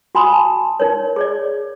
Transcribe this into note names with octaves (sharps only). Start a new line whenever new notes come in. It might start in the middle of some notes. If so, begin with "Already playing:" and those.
F#4 F#5 G#5 B5 C6 D#6
A5
D#4 A#4 C#5
G#4 C#5 D5